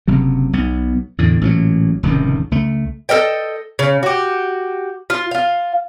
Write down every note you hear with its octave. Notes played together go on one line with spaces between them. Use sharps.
F#1 C3 F#3
B1 B3
E2 A2 D3
A1 A#2 E3 F#3
F1 C#2 A2 D#3
C#2 A3
A4 A#4 D#5 G5
C#3
F#4 G4
F4
F4 F5